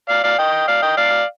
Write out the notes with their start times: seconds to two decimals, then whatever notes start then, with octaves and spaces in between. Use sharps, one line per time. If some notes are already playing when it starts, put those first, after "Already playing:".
0.08 D5 F5
0.23 D5 F5
0.38 D#5 G5
0.68 D5 F5
0.82 D#5 G5
0.97 D5 F5